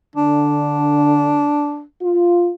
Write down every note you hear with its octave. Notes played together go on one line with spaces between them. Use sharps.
D3 D4
F4